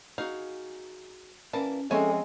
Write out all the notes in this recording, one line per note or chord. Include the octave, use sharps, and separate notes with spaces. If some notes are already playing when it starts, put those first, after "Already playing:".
D#4 F#4 G#4 F5
E3 A#3 C#4 D5 A5
F3 G#3 C4 C#4 A4 C#5 E5 G#5